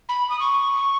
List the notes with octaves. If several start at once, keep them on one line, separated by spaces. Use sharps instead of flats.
B5
D#6
C#6